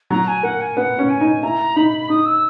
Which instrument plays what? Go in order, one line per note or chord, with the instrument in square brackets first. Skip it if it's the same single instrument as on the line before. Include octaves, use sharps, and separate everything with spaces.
[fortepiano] F#3 [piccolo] A#5
[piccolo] G#5
[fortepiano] A#3 [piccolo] F#5
[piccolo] G#5
[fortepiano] B3 [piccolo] F#5
[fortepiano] C#4
[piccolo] G#5
[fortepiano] D#4
[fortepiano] E4 [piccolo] A#5
[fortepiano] D#4 [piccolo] B5
[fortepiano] D#4 [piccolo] D#6
[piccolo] E6